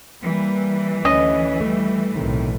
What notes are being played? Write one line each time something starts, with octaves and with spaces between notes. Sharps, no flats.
E3 G3 A#3
D2 C#4 D#5
G3 A3
B1 A2 C3 D#3